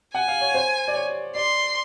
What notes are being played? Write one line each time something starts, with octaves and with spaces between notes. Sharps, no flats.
F#5 G#5
F5
C#5
C5
D5
C#5
D5 C6